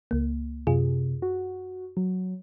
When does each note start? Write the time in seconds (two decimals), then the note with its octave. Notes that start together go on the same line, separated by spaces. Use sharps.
0.11 C#2 A#3
0.67 F#2 C3 F4 G#4
1.22 F#4
1.97 F#3